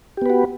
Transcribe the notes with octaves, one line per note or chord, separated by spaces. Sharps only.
B3 F#4 G4 B4